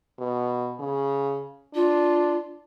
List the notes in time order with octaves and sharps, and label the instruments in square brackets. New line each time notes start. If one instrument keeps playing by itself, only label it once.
[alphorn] B2
C#3
[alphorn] D4 [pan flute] F4